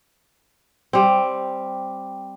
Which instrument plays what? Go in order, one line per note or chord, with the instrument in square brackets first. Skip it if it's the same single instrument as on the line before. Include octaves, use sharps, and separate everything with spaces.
[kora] G3 C4